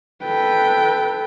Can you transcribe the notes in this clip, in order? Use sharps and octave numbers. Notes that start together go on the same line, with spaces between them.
A4 B4 G5